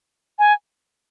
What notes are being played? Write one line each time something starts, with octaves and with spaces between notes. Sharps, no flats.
G#5